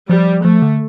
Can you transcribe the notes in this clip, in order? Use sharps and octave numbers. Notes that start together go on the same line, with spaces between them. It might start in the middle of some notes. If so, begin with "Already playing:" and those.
F3 G3
F3 A3
D3